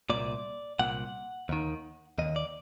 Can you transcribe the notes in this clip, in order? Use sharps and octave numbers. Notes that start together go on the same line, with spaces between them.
C2 A#2 D5
C2 A#2 F#5
D#2 D#3
D#2 D#3 D#5
D5